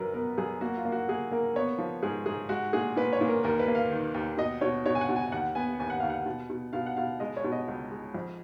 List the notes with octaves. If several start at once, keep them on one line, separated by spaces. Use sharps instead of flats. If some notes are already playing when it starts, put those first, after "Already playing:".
Already playing: F#2 F#3 A#4 B4
B3 A#4
F#2 G#4
A#3 F#4
F4
A#3
F#4
A#3 G#4
A#3 A#4
B3 C#5
F3
G#2 G#4
G#2 G#4
G#3 F#4
A#2 G#4
A#2 B4
C#5
A#2
A#4
D#2 A#4
B4
A#3
F5
D#3
D#2
B2 D#5
B2 C#5
B2 C#5
G#5
F#5
B2
G#5
D#2 F#5
B3 G#5
D#2 G#5
F#5
D#2 F5
F#5
B2
B2
B2 F5
F#5
B2 F5
G#3 D#5
C#5
B2
D#5
C#2
G#3
F2